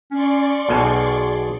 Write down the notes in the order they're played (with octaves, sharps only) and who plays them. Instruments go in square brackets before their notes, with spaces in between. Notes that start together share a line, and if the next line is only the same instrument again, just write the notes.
[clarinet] C#4 [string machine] D5 C6 C#6
[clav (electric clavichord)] B1 B2 G#5 [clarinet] G#4